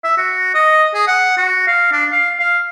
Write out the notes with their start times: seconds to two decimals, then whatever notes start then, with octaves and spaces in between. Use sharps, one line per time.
0.04 E5
0.17 F#4
0.54 D#5
0.94 G#4
1.07 F#5
1.37 F#4
1.67 F5
1.92 D4
2.12 F5
2.39 F5